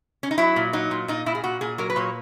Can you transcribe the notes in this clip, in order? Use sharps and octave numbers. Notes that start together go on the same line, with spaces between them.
C#4
D#4
F#3 E4
A#2
F#3 D#4
A#2
A#2 D#4
A#2 E4
G#4
A#2 F#4
A#2 G#4
F#3 A#4
B4
A#2 C#5